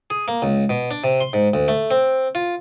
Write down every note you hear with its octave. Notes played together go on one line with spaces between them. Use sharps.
G#4
A#3
C#2
B2
D4
C3
C6
G#2
D2
A3
C4
F4